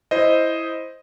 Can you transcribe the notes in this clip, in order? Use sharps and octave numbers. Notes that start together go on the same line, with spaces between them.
E4 C5 D#5